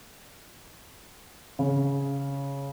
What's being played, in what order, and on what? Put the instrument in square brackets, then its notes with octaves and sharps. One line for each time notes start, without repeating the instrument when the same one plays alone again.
[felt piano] C#3